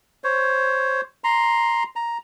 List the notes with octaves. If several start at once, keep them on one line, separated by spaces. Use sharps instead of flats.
C5 C#5
A#5 C6
A#5